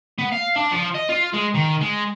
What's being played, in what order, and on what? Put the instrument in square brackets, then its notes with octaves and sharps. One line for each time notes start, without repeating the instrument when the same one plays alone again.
[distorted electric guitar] B3
F5
D4
F3
D#5
F4
G#3
D#3
G#3